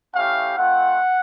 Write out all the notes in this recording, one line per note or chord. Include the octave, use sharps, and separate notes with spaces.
A3 C#4 E4 G4 F5
A3 C4 F4 F#5